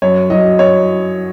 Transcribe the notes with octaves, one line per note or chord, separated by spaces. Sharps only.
F#2 C#5
F#3 D#5
C#5